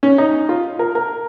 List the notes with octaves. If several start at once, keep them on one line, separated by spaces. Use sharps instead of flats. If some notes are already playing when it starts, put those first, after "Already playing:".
C#4
D#4
F4
A#4
A#4